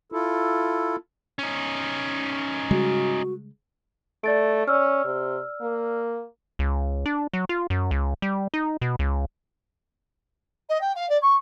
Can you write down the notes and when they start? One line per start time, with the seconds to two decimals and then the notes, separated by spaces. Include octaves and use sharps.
0.12 E4 F4 A4
1.39 C#4 D#4
2.71 C#3 G3 G#3 F#4
4.24 A3 D5 A6 D7
4.68 C#4 D5 E6 F6
5.05 C3
5.61 A#3
6.59 C#2
7.06 D4
7.33 F#3
7.49 F4
7.70 F#2
7.91 C#2
8.22 G3
8.54 D#4
8.82 B2
8.99 C#2
10.69 D#5
10.81 G5
10.95 F5
11.09 D5
11.22 C#6